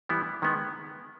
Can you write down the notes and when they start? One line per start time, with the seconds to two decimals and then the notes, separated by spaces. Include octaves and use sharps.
0.09 E3 G3 B3 E4
0.42 D#3 G#3 B3